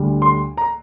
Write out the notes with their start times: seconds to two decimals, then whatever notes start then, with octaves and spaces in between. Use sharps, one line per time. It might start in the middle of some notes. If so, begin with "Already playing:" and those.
Already playing: D2 D3 G3
0.22 C6
0.57 A#5